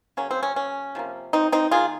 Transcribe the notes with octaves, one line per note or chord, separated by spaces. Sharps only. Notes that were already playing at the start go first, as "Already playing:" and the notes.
C#3 F#3 A#3 C#4
C4
C#4
C#4
C3 F3 A#3
C4 D#4
C4 D#4
D#3 A#3 F4 G#4